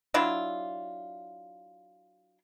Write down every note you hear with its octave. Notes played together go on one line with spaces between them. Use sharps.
F#3 D4 E4 F4